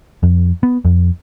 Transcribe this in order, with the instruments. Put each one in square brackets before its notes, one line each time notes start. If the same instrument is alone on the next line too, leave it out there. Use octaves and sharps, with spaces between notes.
[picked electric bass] F2
B3
F2